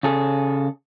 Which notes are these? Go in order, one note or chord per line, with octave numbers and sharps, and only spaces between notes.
C#3 G#4 A4